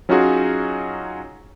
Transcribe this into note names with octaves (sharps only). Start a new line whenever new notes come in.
F#3 C#4 D#4 F4 F#4 G#4